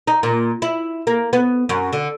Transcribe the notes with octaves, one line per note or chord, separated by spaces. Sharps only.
D#4
A#2
E4
A#3
B3
F#2
D3